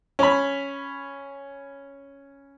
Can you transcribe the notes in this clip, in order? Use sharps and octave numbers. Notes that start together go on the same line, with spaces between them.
C#4 B5